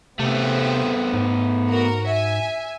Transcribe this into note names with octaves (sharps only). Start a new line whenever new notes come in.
C3 A3 B3 C4 C5 E5
G#2
F#4 A#4
E5 G#5